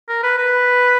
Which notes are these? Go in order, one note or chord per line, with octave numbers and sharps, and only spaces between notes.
A#4
B4
B4